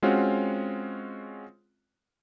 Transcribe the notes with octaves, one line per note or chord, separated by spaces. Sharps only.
G#3 C4 C#4 F4 F#4